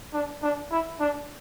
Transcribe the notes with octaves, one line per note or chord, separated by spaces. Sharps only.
D4
D4
E4
D4